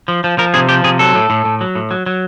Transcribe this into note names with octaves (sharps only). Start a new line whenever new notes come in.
F3
F3
F3 A#4
C3 G#4
F3 G4
C3 G#4
F#3 A4
A2
A2
A2
F#3
A2
F#3
F#3